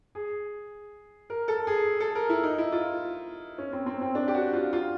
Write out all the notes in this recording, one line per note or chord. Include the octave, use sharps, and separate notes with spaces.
G#4
A#4
A4
G#4
A4
A#4
E4
D#4
E4
F4
C#4
C4
C4
C4
D4
G4
F#4
F4
F4